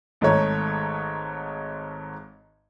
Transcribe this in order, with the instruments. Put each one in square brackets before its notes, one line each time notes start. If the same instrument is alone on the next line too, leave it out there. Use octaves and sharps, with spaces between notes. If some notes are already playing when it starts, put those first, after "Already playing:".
[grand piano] G#1 G#2 A3 D#4 C#5